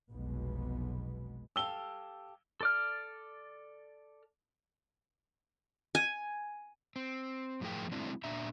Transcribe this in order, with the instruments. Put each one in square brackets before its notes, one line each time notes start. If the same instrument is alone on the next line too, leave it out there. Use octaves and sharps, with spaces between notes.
[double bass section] F1 B1 B2 G#3 B3
[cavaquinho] G4 A4 F5 [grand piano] E6 G7
[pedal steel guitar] A4 D5 F6
[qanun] G#5
[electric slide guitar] C4
F#2 A2 F3 G#4 A#4 G5
F#3 G#3 A3 C4 D4 E4
A#2 D4 E5 A#5